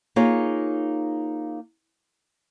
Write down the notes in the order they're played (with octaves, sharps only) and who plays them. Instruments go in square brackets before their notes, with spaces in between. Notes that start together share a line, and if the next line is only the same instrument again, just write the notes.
[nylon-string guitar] A#3 D#4 F4 G#4 C#5